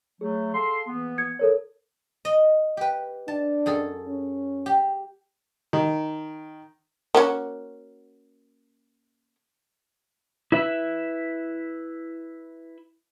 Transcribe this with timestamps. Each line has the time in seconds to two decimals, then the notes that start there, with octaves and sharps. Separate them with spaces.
0.21 F#3 A3 G#4
0.54 A4 F5 C6
0.86 E3 A#3 B3
1.18 G#6 C#7
1.39 A4 A#4 C#5
2.25 D#5
2.77 G4 B4
3.28 D4 A5
3.66 F#2 G#4 A4
4.07 C#4
4.66 G4
5.73 D#3
7.15 A#3 C#4 F#4
10.52 E4 B4 E5